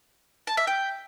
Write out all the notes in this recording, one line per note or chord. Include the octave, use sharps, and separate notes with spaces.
A5
E5
G5